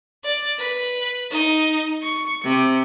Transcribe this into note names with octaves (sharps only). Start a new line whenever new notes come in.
D5
B4
D#4
C#6
C3